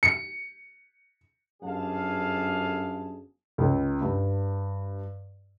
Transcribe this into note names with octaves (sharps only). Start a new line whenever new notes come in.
C#7
G1 F#2 D3 G#4 F5 A5
C#2
G2